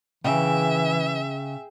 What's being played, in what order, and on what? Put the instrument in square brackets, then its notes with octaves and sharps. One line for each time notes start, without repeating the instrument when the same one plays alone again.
[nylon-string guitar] C#3 [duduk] E3 [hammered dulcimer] G#4 G5 [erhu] E5